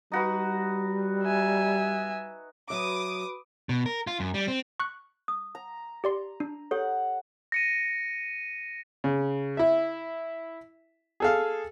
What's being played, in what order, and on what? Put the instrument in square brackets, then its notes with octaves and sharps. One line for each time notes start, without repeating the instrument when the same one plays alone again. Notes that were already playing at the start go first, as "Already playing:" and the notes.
[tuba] G3 [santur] D#4 F#4 B4
[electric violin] E5 G#5
[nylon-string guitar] F#3 E5 [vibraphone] F#4 B4 B5 [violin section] D6 D#6
[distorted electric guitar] B2
A#4
F4
F#2
G3
C4
[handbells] C#6 F#6
[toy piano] D#6
[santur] A#5
[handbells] G4 D5 C6
D4
[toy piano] G4 A4 C#5 [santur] F#5
[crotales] A#6 C#7 D#7
[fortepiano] C#3
E4 E5
G#4 A4 F5